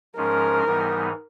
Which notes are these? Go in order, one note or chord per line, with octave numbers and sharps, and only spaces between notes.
G#2 F3 G#3 C#4 A#4
G#2 E3 G3 B3 D#4